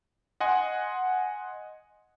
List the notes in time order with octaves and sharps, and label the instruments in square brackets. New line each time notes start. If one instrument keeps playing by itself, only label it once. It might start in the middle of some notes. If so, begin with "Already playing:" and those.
[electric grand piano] D#5 F#5 G#5 C6